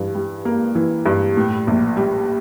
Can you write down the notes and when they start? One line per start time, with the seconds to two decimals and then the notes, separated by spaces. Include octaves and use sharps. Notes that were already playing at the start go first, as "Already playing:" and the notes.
Already playing: G2 E3
0.15 G3
0.45 A#3
0.75 E3
1.06 G2
1.37 A2
1.67 A#1
1.97 G3